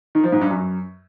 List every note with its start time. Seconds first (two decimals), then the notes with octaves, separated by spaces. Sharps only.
0.15 D#3
0.24 F3
0.32 G#2
0.41 G2
0.50 F#2